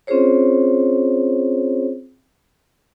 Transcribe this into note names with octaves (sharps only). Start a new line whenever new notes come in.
C4 C#4 F4 G#4 C5 C#5